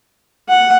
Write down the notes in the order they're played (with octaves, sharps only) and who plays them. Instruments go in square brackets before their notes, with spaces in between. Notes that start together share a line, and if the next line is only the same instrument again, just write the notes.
[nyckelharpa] F#5